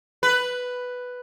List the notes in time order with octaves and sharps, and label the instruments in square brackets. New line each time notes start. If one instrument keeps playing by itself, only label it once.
[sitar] B4